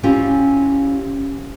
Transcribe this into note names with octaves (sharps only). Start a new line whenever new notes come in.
C4 C#4 E4 F4 G4 C#5